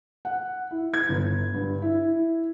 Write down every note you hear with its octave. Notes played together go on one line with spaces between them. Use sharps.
F#5
E4
G#6
G1
G2
E4